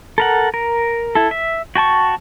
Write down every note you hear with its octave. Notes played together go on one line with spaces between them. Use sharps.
A4 A#4 F#5
A#4
E4 A4
E5
F#4 G5 A5 C#6